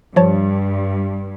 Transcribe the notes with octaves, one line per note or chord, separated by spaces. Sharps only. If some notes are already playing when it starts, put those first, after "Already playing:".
G2 F3 C#5 A5